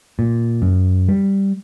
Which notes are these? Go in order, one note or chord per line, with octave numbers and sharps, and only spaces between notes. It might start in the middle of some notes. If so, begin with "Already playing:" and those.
A#2
F#2
G3